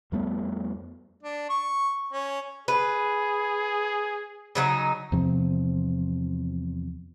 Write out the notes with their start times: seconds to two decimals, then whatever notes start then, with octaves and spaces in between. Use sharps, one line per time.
0.12 F2 G3 A3 B3
1.23 D4
1.50 C#6
2.13 C#4
2.68 G#4 B4
4.55 C#3 F#3 D#4
5.12 E2 C3 F3 C4